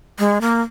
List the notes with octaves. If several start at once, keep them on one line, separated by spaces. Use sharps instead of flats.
G#3
A#3